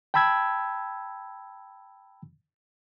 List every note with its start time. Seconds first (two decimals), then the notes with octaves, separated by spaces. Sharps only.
0.14 G5 A5 B5 E6 G#6